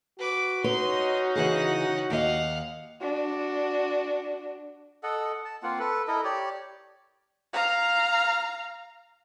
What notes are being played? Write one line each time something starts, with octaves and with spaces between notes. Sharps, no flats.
F#4 B4 D6
C#4 D#4 B4 C#5 C6
C#3 E3 G#4 F#5
D#2 D#5 F5 F#5
D4 F#4
A4 D#5 F#5
A5
A#3 C4 F4 F#5
A4 B4
E4 A4 A#4 D#5
G4 C#5 D5
F5 A#5